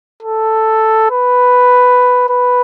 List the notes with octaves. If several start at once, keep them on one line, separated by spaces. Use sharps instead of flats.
A4
B4
B4